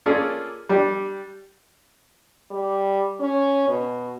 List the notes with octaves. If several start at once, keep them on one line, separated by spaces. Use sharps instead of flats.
A#3 C#4 F4 G#4 A4 D5
G3 D4 G4
G3
C#4
B2